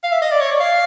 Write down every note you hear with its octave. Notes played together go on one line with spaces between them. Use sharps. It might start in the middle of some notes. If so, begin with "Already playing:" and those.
F5
E5
D#5
D5
C#5
D5
F5